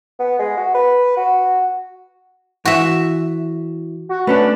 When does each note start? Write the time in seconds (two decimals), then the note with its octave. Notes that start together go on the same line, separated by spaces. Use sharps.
0.20 B3
0.39 G#3
0.57 F#4
0.75 B4
1.17 F#4
2.65 E3 F#4 E5
4.09 F#4
4.27 A3 C#4 D4 B4